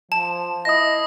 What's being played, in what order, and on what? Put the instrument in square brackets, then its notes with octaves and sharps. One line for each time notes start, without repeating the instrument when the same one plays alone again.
[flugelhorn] F3 [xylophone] A5
[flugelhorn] E4 [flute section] D#5 [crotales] D#6 A#6